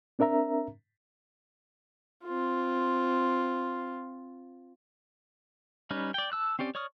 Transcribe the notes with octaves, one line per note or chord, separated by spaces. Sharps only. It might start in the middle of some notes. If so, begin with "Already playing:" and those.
C4 D4 A#4 E5 A#5
C4 F4
G3 C#4 D#4 B4
D5 G5
A5 E6 F#6
C4 C#4 G4 D5
C#5 D5 C#6 D#6 F6